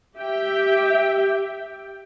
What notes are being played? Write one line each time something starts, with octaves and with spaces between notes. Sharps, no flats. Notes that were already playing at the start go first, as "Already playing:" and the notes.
G4 E5 G5